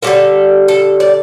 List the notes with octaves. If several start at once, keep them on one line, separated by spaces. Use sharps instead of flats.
D3 G3 A#3 A4
A4
D5